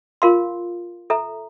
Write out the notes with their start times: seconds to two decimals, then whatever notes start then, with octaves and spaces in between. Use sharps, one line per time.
0.22 F4 A#4 F5 C6
1.10 A4 E5 A#5